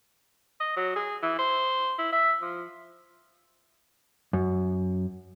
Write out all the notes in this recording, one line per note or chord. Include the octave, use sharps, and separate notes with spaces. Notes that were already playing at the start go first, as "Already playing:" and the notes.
D#5
F#3
G#4
E3
C5
E4
E5
F3
F#2